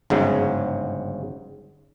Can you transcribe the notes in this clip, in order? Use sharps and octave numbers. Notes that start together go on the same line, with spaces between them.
G1 G#2 C#3 F#3